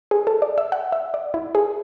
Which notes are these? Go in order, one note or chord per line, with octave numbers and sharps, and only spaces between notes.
G#4
A4
D5
E5
F#5
E5
D5
E4
G#4